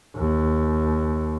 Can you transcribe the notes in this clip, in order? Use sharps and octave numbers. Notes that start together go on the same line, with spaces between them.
D#2